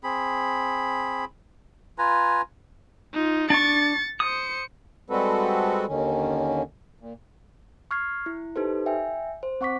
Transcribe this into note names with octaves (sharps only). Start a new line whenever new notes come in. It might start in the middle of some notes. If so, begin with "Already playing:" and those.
C4 G#4 B5
F4 B4 G#5 A#5
D#4 F4
D4 C#6 A6 C#7
C5 D#6 C#7
G3 G#3 C4 F#4 A4 B4
D#2 D3 D#3 C#4
A#2
C#6 F6 G#6 C7
E4
D#4 G4 A4 B4 C5
E5 G5 G#5
C5
C4 F#5 C#6 D6 B6